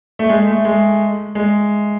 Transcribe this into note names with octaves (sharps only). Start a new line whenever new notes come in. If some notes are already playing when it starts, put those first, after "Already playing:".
A3
G#3
A3
G#3
G#3